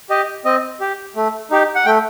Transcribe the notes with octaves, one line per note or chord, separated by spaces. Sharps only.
G4 D#5
C4 D#5
G4
A3
D#4 G4
F#5
A3 G5